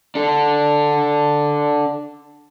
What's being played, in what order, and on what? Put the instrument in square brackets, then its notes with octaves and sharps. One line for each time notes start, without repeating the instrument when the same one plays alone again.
[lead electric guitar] D4 A4